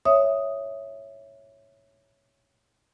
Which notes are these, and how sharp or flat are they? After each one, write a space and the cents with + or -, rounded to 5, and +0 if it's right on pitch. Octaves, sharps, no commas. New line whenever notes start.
C#5 +0 E5 +0 D#6 +0